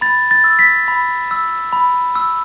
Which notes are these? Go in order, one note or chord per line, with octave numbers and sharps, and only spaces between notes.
B5 A6
A6
E6
B6
B5
E6
B5
E6